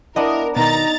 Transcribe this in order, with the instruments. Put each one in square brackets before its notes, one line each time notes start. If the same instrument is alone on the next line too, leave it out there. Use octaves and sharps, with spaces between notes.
[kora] B3 D4 D5 [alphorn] E4 [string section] A#4 [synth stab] D#5
[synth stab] B2 D#3 [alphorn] D#4 [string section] A#5 A6